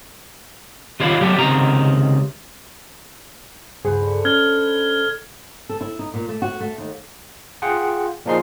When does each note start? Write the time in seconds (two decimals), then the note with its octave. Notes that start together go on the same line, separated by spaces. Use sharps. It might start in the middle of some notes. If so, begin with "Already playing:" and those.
1.00 D#3 F4 G4 C#5 F5 B5
1.21 F#3 G3 A3 B3 G4
1.38 C#2 C3 D#3 A#5
3.84 C#2 G2 G#4 C5 F#5 B5
4.02 D3
4.25 C#4 F6 G#6 G7
5.69 A4
5.81 E4
5.99 D#4
6.14 A#2
6.29 A3
6.42 F#4
6.60 A3
6.78 D#2
7.62 F4 G#4 F#5 G5
8.26 A#2 F3 D#4 G#4 C6 C7